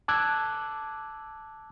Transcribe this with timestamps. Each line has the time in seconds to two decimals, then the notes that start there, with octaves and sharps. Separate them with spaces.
0.08 A5 D6 E6 F#6 G#6